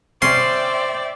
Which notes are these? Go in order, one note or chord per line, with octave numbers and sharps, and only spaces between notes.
C#4 C5 D5 E5 G5 C6